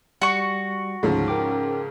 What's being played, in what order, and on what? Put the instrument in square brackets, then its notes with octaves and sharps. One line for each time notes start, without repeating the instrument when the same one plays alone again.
[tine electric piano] G3 [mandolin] F#4 C#6
[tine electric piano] D2 [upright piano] G#2 C#3 F3
[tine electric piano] A#4 G5 D6